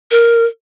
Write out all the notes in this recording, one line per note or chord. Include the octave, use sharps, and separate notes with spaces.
A#4